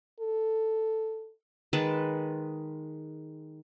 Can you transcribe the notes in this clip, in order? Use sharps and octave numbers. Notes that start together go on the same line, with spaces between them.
A4
D#3 G#3 B4 A5